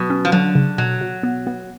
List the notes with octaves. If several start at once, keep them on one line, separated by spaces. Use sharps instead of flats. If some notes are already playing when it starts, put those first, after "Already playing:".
Already playing: B2 F#3
C#4
F3
D3 F#3
C#3
B2 F#3
B2
B3
B3